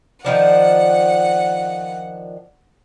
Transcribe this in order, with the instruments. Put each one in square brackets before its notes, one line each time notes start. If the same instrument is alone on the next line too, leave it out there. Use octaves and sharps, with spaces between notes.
[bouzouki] D#3 F3 D4 [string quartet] F#5